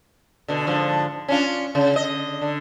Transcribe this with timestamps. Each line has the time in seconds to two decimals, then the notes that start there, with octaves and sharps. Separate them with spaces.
0.48 B2 D3
0.67 G#2 D3 F3
1.28 C#4 D4 F4
1.75 C#3
1.95 D3 D#5
2.42 D3